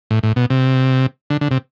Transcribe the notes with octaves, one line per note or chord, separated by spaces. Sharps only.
A2
A2
B2
C3
D3
D3
C3